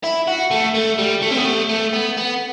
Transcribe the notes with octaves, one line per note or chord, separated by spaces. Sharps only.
E4
F#4
A3
A3
G3
A3
C4
B3
A3
A3
B3
B3